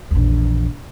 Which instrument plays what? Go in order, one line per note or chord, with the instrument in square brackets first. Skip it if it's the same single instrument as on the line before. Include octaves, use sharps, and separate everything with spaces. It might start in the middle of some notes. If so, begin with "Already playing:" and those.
[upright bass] A#1 E2